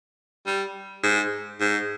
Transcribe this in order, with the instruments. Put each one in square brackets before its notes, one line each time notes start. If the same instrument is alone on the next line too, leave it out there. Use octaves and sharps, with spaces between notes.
[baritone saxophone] G3
G#2
G#2